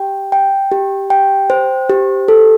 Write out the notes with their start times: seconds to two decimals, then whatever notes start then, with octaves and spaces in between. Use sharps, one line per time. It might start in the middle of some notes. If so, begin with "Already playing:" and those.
Already playing: G4 G5
0.32 G5
0.71 G4
1.10 G5
1.50 C5
1.90 G4
2.28 A4